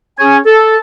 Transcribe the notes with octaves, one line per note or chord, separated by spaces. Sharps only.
C#4 G#4 C#5 G#5
A4